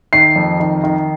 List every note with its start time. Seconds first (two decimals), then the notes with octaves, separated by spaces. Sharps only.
0.13 D#3 C7
0.36 F2
0.60 D#3
0.84 D#3